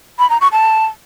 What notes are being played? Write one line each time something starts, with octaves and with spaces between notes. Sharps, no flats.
B5
A#5
C#6
A5